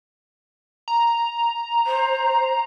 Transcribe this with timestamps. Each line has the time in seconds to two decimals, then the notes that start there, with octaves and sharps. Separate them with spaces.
0.88 A#5
1.86 C5